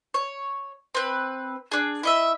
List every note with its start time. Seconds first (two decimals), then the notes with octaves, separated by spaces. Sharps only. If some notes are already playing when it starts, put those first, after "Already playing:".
0.14 C#5
0.95 C4 B4
1.72 D4 G#4
2.03 E4 D#5 E5